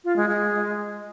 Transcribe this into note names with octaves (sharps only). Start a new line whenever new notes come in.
F4
G#3
G#3